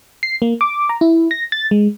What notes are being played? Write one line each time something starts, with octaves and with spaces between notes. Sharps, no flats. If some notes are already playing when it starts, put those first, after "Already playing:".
C7
A#3
D6
A#5
E4
A#6
A6
G#3